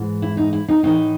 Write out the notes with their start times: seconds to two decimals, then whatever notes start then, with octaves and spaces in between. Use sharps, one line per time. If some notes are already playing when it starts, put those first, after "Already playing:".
Already playing: G#2 E3
0.22 E4
0.37 D#4
0.53 E4
0.68 D#4
0.83 A2 E3 D#4